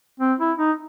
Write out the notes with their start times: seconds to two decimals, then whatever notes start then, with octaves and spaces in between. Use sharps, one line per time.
0.20 C4
0.39 E4
0.58 D#4